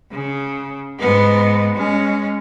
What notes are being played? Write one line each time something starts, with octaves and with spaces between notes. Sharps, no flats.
C#3
G#2 B3
G#3 C#4